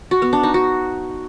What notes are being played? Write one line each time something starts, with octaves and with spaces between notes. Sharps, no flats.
F#4
B3
D4
D#4
F#4